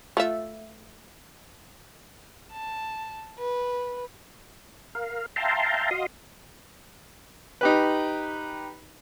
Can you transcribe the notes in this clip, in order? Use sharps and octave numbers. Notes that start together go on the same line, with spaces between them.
A3 F4 E5
A5
B4
A#4 F5
E5 F5 G5 A5 A#5 C6
F#4 D#5 F5 C6 D#6
D#4 G4 B4